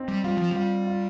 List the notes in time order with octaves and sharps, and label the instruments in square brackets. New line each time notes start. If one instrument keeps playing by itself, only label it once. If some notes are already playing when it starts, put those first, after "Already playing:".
Already playing: [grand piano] C4 D#4
[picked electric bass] G3
[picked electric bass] G3 [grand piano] F4
[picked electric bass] F3
[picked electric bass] G3 [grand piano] F4
[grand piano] F4